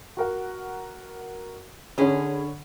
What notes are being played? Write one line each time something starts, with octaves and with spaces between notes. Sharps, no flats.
F#4 A#4 F#5
D3 C#4 G#4 C#5 B5